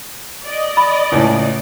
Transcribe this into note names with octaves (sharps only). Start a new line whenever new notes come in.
D5 D#5
B5
C#2 A2